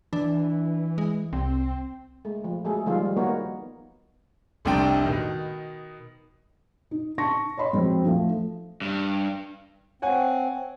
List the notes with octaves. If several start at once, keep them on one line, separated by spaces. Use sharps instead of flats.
E3 D4
G#3
C2 C4
G#3 A3
F3
F#3 G#3 A3 G#4 A4
D#3 F3 G3 G#3 F4
G3
A#3 B3 D#4 F#4 A#4 C#5
F1 C2 C3 D4 G5 C6
B2 D#3
D#4
A5 C6 C#6 A#6
C#5 D#5 B5 C6
F2 F#3 G#3 C4
F3 A3
G2
C4 C#5 F#5 G#5